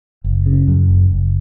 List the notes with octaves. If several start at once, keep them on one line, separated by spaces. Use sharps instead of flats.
F#1
C#3
F#2
F#1
F#1